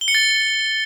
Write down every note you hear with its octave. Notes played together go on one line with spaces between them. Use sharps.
G7
C#7
A6